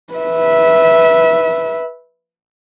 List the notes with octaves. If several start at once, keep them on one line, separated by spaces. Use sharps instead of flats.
B4 E5